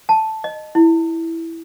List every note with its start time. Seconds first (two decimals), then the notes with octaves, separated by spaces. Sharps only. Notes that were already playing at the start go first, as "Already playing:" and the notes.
0.09 A5
0.44 D#5
0.75 E4